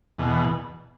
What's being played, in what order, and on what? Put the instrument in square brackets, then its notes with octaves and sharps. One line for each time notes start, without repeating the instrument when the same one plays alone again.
[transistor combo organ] E2 B2